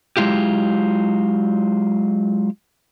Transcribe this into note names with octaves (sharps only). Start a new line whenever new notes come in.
F#3 G#3 E4 F4 G4